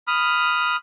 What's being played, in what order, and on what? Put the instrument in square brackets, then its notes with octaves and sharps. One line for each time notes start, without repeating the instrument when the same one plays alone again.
[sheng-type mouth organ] B5 D#6 F6